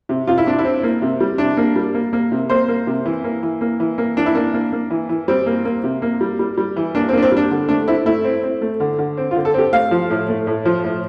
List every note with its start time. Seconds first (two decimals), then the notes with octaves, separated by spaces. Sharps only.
0.09 C3
0.27 C3 F4
0.38 E4
0.46 C3 D4
0.59 E4
0.64 C4
0.83 A#3
1.02 C3
1.20 G3
1.38 C3 D4
1.57 A#3
1.76 G3
1.94 A#3
2.13 A#3
2.32 C3
2.50 A#3 C5
2.68 A#3
2.87 C3
3.05 E3
3.24 A#3
3.43 E3
3.61 A#3
3.80 E3
3.98 A#3
4.17 E3 D4
4.26 E4
4.35 A#3 D4
4.54 A#3
4.72 A#3
4.90 E3
5.09 E3
5.28 G3 C4
5.46 A#3
5.65 A#3
5.84 C3
6.02 A#3
6.21 G3
6.39 G3
6.57 G3
6.76 E3
6.95 A#3 D4
7.09 C4
7.13 A#3 D4
7.22 C4
7.32 G3
7.37 D4
7.50 D3
7.69 A3 D4
7.88 C4 E4
8.06 A3 E4
8.24 C4
8.43 C4
8.62 A3
8.80 D3
8.98 D3
9.17 C4
9.31 F4
9.36 D3
9.45 A4
9.54 C4 G4
9.73 A3 F5
9.91 F3
10.10 A2
10.29 A3
10.47 A2
10.65 F3
10.84 A2